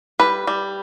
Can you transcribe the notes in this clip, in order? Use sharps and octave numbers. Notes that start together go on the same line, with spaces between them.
G3 B4
G3